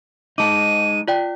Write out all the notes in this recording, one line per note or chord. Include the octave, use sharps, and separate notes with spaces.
G#3 D#4 A5 D6 D#7
F4 D5 G5